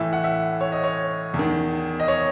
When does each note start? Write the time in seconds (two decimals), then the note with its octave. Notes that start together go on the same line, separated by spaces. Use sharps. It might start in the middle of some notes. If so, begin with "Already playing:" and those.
Already playing: A2 E3 E5
0.13 F#5
0.24 E5
0.61 C#5
0.72 D#5
0.84 C#5
1.34 E2
1.39 D#3
2.00 D#5
2.08 C#5